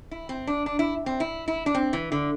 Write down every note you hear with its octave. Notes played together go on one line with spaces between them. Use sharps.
E4
C4
D4
D4
E4
C4
E4
E4
D4
C4
E3
D3